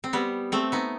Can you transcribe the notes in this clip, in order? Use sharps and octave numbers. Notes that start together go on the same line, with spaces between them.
C4
G3 B3
A3 C4
B3 D#4